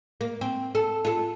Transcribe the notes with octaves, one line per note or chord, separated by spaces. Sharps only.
A#3
C4
A4
F4 A4